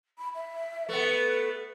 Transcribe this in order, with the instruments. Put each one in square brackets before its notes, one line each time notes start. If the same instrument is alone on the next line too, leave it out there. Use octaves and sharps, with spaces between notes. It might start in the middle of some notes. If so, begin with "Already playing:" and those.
[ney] B5
E5
[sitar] A3 B3 [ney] B4